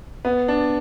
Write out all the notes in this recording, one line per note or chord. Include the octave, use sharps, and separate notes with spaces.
B3
D4